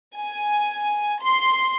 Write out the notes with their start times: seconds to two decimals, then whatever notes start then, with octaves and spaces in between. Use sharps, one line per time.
0.18 G#5
1.22 C6